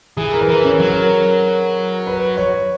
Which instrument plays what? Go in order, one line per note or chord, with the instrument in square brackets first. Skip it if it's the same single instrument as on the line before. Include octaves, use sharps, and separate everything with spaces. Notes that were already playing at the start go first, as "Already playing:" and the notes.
[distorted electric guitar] E3 [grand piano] G#4
[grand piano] A#4
B4
[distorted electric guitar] E3
[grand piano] C#4
[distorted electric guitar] F#3
[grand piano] A#4
B4
C#5